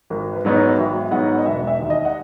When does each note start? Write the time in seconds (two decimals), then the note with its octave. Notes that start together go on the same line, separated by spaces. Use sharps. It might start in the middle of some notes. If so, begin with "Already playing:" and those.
0.10 G#1 A#4
0.33 B4
0.45 G#2 F#3 B3 D#4 C#5
0.56 D#5
0.78 G#1 E5
1.11 G#2 F#3 B3 D#4 F#5
1.39 D#5
1.45 E1 E5
1.67 E5
1.79 D#2 D#3
1.90 D#5
2.05 F#5